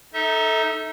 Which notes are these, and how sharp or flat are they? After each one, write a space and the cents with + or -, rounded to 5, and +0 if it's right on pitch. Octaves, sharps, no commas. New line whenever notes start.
D#4 +0 A4 +0 E5 -35